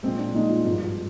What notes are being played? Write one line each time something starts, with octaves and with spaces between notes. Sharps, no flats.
A#1 A#2 G#3 C4
D4
A#1 A#2 G#3 D#4
F4
G#1 G2 F3 G#3